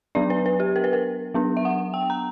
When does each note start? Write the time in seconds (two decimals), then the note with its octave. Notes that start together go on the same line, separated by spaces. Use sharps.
0.15 F#3 B3 D4 D5
0.30 B4
0.46 B4
0.60 G4
0.76 A#4
0.84 B4
0.93 A#4
1.34 F#3 B3 D4
1.57 E5
1.65 F#5
1.94 G5
2.10 A#5